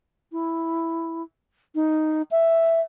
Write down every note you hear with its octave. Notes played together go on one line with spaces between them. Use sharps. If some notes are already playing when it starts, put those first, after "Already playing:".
E4
D#4
E5